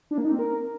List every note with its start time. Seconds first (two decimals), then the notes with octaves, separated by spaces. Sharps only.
0.11 D4
0.18 A#3
0.25 D#4
0.32 C4
0.39 A#4